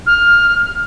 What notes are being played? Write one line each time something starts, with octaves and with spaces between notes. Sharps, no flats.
F6